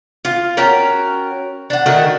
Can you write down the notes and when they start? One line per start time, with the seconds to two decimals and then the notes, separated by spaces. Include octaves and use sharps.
0.25 F4
0.57 C#4 F#4 A#4 G5
1.70 D4 F#5
1.86 D3 D#3 A3 F#4